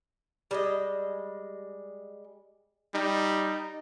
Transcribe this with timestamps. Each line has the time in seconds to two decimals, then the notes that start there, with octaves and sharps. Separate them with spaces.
0.51 G3 G#3 D#5
2.95 G3 D#4